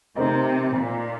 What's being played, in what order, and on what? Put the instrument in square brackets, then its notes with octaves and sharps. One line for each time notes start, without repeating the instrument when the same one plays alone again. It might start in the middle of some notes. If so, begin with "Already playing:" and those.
[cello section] C3 [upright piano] A3 C4 D#4 A#4 D#5
[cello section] A#2